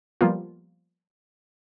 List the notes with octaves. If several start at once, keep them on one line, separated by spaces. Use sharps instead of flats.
F3 G3 A#3 B3 F4